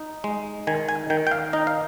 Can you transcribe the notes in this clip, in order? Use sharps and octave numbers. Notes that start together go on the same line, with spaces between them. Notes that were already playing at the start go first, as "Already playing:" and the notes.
Already playing: D#4
G#3
D#3 G#5
G#5
D#3 G5
G5
F5
D#4 D#5
F5